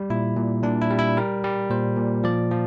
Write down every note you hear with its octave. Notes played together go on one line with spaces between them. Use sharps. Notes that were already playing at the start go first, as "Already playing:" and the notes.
Already playing: G3
A#2 E4
A#2
A#2 D4
E4
G3
E4
G3 A#4
G3
A#2 C5
A#2
F3 D5
F3